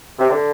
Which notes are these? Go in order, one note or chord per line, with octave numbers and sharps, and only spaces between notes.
C3
D3